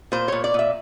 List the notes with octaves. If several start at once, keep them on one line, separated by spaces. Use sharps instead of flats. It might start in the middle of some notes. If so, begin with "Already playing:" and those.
A#2 C5
A#2 C#5
D5
A#2 E5